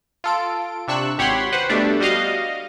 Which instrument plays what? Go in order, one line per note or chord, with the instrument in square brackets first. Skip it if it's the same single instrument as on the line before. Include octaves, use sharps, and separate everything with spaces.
[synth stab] F4 A4 D7
C3 D4 C#6 E6 F#6
G#1 G4 C#5 F#5 B5 C6
B4 C5 F#5
B2 G3 A3 D4
G3 F#4 D#5 F5